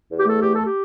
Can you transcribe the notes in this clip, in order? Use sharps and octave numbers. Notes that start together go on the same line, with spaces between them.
E2
G4
A3 A4
E2 G4
A4
G4